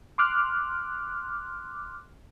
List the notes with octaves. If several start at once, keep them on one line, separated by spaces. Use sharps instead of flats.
C6 D6 F6 F#6